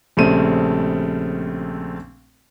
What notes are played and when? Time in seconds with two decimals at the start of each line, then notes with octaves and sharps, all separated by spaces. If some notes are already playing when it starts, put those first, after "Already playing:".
0.17 A#1 C#3 G3 A3 C4 D#7